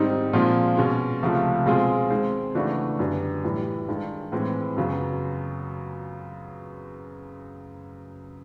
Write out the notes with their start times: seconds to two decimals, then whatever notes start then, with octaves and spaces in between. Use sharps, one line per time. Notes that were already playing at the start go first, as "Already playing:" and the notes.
Already playing: G#2 D#3 G3 C4 D#4
0.33 A#2 F3 G#3 C4 F4
0.77 B2 G#3 C#4
1.22 C#2 C3 F3 A3
1.66 B2 G#3 C4 F4 G#4
2.10 D#3 G#3 C4
2.55 C#3 E3 A3 D4 F#4
2.99 F#2 D3 G3 B3 D4
3.44 A2 E3 G3
3.88 G2 D#3 G#3
4.32 A2 E3 G#3 C4
4.77 F#2 C#3 F#3 B3